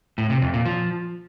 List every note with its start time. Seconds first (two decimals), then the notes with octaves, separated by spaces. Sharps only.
0.18 A2
0.30 C3
0.42 F2
0.54 A#2
0.66 F3